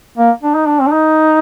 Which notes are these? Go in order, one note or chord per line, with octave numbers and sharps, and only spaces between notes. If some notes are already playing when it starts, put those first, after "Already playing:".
A#3
D4
D#4
D4
C4
D4
D#4